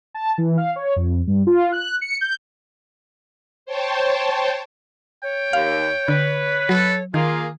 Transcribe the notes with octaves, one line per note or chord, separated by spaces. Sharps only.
A5
E3
F5
C#5
F2
G2
F4
F#6
C#7
G6
C5 C#5 G5 A5
C#5 G5
D#2 F5
D3 B4
F#3 A4
D#3 A#3 F4 G#4